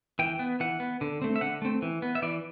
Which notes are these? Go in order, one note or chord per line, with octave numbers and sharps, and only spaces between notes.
E3 G5
B3
E3 F#5
B3
D3
A3 C4
E5
D3 F#5
A3 C4
E3
B3
E5
E3 D5